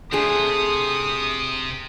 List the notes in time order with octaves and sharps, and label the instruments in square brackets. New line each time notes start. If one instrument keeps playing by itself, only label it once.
[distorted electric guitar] C3 [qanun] A3 D4 G#4 [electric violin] D#6